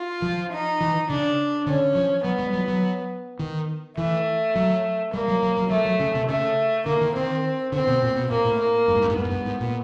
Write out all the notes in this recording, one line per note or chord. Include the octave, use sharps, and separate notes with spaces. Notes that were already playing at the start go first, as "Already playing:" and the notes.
Already playing: F4
F3
D#4
E3
C#3 D4
D3 C#4
F3
F#3 B3
G3
F#3
F#3
D#3
E3 A3
F#3
G3 A#3
F#3
F#3
F#3
F#3 A3
F#3
C#3
C3
C#3 A3
D3 A#3
D#3
D#3 C4
D3 C4
B2
A#2
B2
A#2 A#3
A2
A#3
G2
G#2
G2
G#2
G2 B3
G#2
G2
G#2
A#2